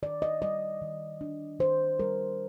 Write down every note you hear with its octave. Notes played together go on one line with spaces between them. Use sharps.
D#3 D5
D#5
G3 D#5
D#3
D4
D#3 C5
G3 A#4